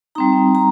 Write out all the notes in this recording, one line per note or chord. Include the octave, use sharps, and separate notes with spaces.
G3 C4 D#4 A#5
A#5